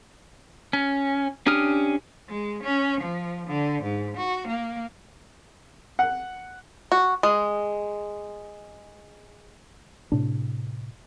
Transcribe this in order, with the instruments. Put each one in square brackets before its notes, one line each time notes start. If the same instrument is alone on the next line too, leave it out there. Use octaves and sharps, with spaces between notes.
[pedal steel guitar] C#4
C#4 D4 G4 D#6 F6
[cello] G#3
C#4
F3
D3
G#2
F#4
A#3
[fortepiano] F#5
[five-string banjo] F#4
G#3
[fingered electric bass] A2 C3 D4